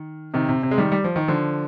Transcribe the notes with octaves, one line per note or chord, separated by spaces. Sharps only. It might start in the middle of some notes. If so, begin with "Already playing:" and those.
Already playing: D#3
C3 D#3
C3
C3
G#3
D#3 G3
G3
F3
D#3
D3 F3